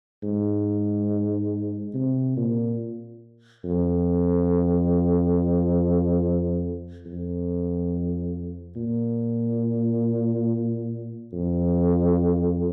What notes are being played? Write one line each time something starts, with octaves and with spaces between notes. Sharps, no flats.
G#2
C3
A#2
F2
F2
A#2
F2